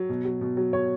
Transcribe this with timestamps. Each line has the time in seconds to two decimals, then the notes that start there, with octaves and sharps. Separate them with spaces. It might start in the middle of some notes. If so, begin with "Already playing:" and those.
Already playing: F#3
0.09 B2
0.25 F#3
0.41 B2
0.57 F#3
0.73 B2 C#5